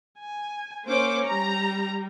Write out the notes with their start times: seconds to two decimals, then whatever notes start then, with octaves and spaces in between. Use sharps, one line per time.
0.19 G#5
0.85 A#3 C#4 C5 D6
1.27 G3 A#5